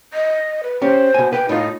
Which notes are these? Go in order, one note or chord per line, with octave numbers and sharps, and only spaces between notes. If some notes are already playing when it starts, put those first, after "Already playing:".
D#5
B4
C#4 G4 C5
B2 G#5
B4 G5
A2 D#4 F4